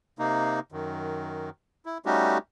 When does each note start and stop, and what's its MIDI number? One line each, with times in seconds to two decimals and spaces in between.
0.19 0.60 48
0.19 0.60 58
0.19 0.60 63
0.72 1.50 42
0.72 1.50 51
1.86 1.98 64
2.06 2.38 55
2.06 2.38 57
2.06 2.38 61
2.06 2.38 63
2.06 2.38 66
2.06 2.38 67